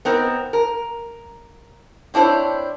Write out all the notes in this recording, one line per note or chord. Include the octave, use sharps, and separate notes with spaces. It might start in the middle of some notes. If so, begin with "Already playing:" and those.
B3 C4 D#4 A#4
A#4
C4 D4 E4 C5 C#5